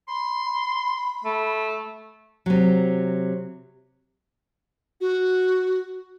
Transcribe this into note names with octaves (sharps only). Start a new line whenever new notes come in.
B5 C6
A3
C3 F#3
F#4